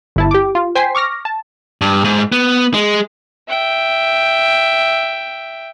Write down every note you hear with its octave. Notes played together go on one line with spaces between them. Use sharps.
G1 E4 A5
G4 D6
F4
C5 G5 G#5 B6 C7
C#6 D6 F6 A#6
A5
G2
G#2
B3
G#3
E5 G5